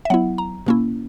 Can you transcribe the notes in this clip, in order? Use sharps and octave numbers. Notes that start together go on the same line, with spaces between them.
E5
F#3 B3 E4 F#5
A#5
B2 A#3 C#4 E4